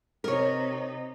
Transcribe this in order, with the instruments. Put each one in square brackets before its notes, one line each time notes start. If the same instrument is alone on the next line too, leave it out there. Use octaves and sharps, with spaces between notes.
[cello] C3 D#4 [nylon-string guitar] A#4 C#5